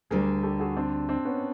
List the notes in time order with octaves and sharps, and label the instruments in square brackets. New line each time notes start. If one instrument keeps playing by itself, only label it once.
[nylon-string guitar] D2 D3 G3 [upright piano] G#4 A#4
[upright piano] G4 A4
F#4 G#4
C4 D4
C4 D4
B3 C#4